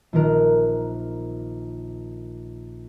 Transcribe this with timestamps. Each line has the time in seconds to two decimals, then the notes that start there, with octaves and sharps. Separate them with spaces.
0.13 A#1 D#3 A#4 F#6